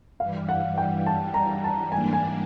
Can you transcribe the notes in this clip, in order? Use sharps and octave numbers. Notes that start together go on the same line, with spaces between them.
G2 E3 G3 F5
F#5
G5
A5
A#5
A5
G#2 E3 G3 A#3 D4 G#5
G#5